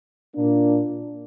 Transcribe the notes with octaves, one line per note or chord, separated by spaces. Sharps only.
A#2 A#3 D4